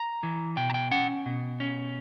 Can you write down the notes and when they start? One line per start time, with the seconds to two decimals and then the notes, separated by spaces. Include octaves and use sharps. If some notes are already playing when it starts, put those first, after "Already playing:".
Already playing: A#5
0.23 E3
0.57 B2 G5
0.70 A#5
0.74 G5
0.91 C#4 F#5
1.26 B2
1.60 C#4